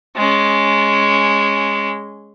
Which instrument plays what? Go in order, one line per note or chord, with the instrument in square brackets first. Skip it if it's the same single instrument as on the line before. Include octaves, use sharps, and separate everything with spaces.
[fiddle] G#3 C#4